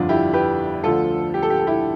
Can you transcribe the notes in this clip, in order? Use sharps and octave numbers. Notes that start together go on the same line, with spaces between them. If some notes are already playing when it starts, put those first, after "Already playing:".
Already playing: G1 F2 D3 D4 F4
E4 G4
G4 B4
D2 D3 F3 F4 A4
G4
A4
G4
A4
E4 G4